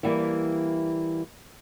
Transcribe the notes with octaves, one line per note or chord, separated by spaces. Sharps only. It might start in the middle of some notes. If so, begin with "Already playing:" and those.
E3 G3 A#3 E4